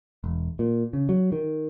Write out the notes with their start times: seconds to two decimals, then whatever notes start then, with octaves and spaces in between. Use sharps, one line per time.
0.24 E1
0.59 A#2
0.93 C#3
1.09 F#3
1.32 D#3